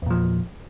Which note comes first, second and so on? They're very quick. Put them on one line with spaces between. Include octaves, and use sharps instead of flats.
E2 A#2 F3